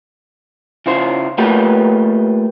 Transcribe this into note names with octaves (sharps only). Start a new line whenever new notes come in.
C#3 E4 F4 C5
A3 A#3 F4 G4 B4